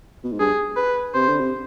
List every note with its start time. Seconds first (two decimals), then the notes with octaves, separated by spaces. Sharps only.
0.24 B2
0.32 G#2
0.40 G2 G#4
0.77 B4
1.14 C3 C5
1.28 D3
1.40 C3